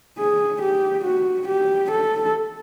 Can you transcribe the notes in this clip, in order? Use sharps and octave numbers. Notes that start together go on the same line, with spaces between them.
G#4
G4
F#4
G4
A4